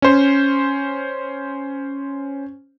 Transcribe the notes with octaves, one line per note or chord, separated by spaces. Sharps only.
C#4 C5